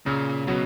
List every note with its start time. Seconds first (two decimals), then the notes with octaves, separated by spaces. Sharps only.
0.06 A#2 C#3
0.47 B2 F#3